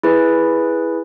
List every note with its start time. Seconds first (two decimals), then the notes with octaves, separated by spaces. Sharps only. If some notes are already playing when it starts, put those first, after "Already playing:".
0.03 E4 G#4 B4